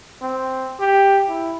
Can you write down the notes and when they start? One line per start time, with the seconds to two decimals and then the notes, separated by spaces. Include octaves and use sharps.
0.22 C4
0.80 G4
1.29 E4